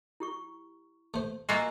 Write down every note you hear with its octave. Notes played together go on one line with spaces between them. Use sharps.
E4 G4 C#6
A3 C5
A#3 F4 F#4 D#5 G#5 E6